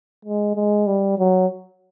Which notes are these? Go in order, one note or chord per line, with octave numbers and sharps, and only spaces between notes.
G#3
G#3
G3
F#3